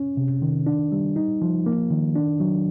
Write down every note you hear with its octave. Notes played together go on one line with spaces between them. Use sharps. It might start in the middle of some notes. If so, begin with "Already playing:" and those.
Already playing: C#4
C3
D#3
D4
G3
D#4
F3
A#3
D#3
D4
F#3